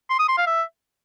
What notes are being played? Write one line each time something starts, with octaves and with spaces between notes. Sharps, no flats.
C6
D#6
C6
F5
E5